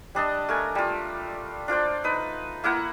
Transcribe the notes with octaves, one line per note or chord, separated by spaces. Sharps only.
G3 D4 D#5 A5
A3 A#4 G#5
G3 F4
D4 F4 C5 D5
D#4 B4
A#3 E4 A#4 F#5